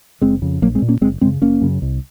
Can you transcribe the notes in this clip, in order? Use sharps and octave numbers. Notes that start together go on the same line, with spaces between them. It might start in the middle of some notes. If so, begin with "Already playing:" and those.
F#1 G#3 C4
F2 C#3
A#1 F#3 A#3
G#3 C4
A#2
A#3 C#4
F#1 G#3 C4
F#2 C#3 G#3 C4
F#1 A#3 C#4
F#2 C#3
C2